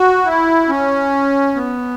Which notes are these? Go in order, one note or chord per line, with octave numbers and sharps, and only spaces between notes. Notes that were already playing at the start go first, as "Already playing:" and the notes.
Already playing: F#4
E4
C#4
B3